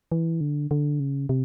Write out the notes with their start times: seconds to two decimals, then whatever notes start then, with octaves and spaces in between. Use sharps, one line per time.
0.12 E3
0.41 D3
0.71 D3
1.00 C#3
1.29 C3